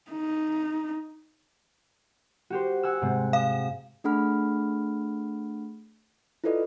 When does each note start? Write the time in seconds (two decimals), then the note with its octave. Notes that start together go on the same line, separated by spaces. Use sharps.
0.11 D#4
2.50 F#4 G4 C5
2.83 F#5 G#5 E6
3.02 G#2 C3
3.33 F5
4.04 A3 D4 G#4 F#5 B5 F6
6.44 E4 F4 A4 B4 D5 D#5